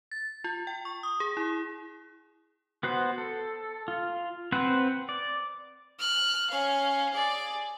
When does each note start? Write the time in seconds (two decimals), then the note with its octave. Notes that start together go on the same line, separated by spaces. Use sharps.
0.11 A6
0.44 F4
0.67 G5
0.85 C#6
1.03 D#6
1.20 G#4
1.37 E4
2.83 B3 F#4 C5
3.18 A4
3.88 F4
4.52 C4 B4 C5 F#5
5.09 D5
5.99 F6 F#6
6.50 C#4 F5
7.13 G#4 D5